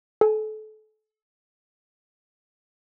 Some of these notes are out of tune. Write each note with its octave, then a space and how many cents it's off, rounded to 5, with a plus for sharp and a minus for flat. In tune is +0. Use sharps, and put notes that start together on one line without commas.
A4 -30 G#5 +0